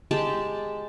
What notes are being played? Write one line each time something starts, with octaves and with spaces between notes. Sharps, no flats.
G#3 G4 A5